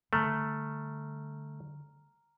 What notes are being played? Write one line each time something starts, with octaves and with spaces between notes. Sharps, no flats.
D3 G3 A3 A#5 F6